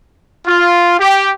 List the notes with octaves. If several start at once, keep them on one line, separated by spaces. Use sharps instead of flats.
F4
G4